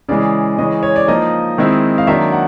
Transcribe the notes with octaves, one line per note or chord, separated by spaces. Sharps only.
C#3 E3 G#3 D5
C#3 E3 G#3 C#4 D#5
C#5
D5
F3 A#3 D#4 D#5
D#3 G#3 C4 E4
F5
D#3 F#3 A#3 D4 E5
F#5